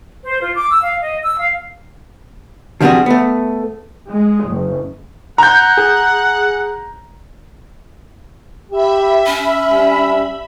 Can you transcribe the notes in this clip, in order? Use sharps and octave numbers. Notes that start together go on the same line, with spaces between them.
C5
F4
D6
E6
F5
D#5
E6
F5
D3 F3 G3 C4 F#4 G#4
A3 B3
G#3
F#1
F#5 A#5 G6
G#4
G4 E5 B5
C#4
G3